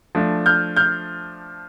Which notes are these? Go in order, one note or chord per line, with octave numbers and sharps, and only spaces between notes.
F3 A3 D4
F6 G6
F6 G6